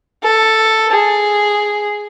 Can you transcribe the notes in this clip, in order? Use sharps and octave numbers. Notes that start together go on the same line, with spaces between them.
A4
G#4